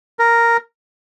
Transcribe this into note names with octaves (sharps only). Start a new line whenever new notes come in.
A#4